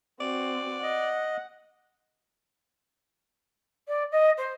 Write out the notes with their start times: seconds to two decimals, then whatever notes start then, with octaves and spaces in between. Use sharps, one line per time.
0.20 C4 F#4 D5
0.83 D#5 F#5
3.88 D5
4.12 D#5
4.38 C5